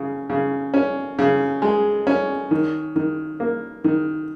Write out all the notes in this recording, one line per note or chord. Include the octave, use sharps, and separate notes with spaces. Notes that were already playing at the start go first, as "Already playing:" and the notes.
Already playing: C#3
C#3
C#4
C#3
G#3
C#4
D#3
D#3
A#3
D#3